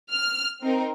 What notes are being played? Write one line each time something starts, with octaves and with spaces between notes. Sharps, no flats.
F6
C4 D#4 A#4